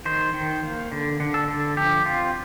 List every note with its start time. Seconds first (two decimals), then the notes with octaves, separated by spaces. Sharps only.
0.05 D#3 C5
0.34 D#3
0.63 A#3
0.92 D3
1.20 D3
1.34 A4
1.48 D3
1.77 F3 G4
2.06 C4 F4